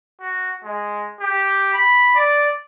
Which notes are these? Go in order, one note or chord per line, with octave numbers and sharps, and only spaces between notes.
F#4
G#3
G4
B5
D5